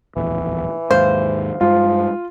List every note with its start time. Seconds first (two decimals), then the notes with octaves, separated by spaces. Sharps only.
0.16 D1 A#1 E2 E3
0.91 D#2 G#2 C5 F5
1.61 G2 F3 G#3 F4